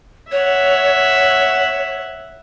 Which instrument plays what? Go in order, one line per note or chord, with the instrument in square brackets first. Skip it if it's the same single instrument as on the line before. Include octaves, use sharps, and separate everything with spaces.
[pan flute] C#5 [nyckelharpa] E5 F#5